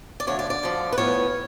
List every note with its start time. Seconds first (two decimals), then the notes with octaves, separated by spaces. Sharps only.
0.20 D5
0.27 D2 D3 F3 C#5
0.39 D5
0.50 D5
0.63 D2 D3 F3
0.92 B4
0.98 A2 F3 B3 C#5